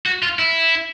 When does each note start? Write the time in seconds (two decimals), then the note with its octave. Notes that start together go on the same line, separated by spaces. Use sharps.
0.06 F#4
0.23 F4
0.39 E4